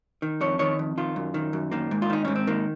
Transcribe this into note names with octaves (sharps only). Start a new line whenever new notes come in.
D#3
F2 C#5
D#3 C#5
F2
D#3 F4
F#2
D#3
F#2
D#3 A#3
G#2
F4
D#3 D#4
G#2 C#4
C4
D#3 A#3